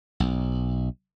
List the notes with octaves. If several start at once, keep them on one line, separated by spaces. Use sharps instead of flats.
B1